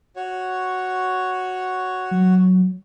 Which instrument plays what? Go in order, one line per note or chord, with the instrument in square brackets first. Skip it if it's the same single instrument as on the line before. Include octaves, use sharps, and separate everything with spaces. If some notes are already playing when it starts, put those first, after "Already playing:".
[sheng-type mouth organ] F#4 C#5
[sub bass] F#3